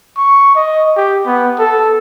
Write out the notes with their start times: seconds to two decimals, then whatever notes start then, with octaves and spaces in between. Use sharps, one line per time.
0.17 C#6
0.56 D#5
0.97 G4
1.26 B3
1.59 A4